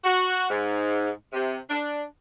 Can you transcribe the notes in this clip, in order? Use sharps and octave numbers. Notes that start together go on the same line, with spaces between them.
F#4
G#2
C3
D4